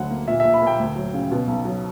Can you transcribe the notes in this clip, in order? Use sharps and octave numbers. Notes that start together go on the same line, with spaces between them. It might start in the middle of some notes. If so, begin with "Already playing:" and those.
Already playing: D2 D3 F#3 F#5
A#3
A#2 E5
E5
A#1
B5
A#3 G5
D2
F#3
C#3
B2
B1
F#3